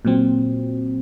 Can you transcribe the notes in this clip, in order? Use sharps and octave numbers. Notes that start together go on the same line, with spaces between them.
A#2 F#3 C4